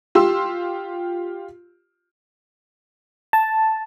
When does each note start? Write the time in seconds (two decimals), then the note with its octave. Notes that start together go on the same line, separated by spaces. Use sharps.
0.15 F4 G4 C6 E6
3.33 A5